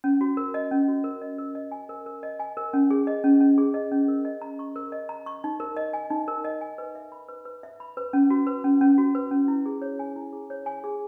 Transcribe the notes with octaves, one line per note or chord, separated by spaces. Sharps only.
C#4
F#4
A#4
D#5
C#4
F#4
A#4
D#5
A#4
D#5
G#5
A#4
A#4
D#5
G#5
A#4
C#4
G#4
D#5
C#4
C#4
G#4
D#5
C#4
A#4
D#5
A#5
C#6
A#4
D#5
A#5
C#6
D#4
A#4
D#5
G#5
D#4
A#4
D#5
G#5
B4
E5
B5
B4
B4
E5
B5
B4
C#4
F#4
B4
C#4
C#4
F#4
B4
C#4
E4
G#4
C#5
G#5
E4
G#4
C#5
G#5
G#4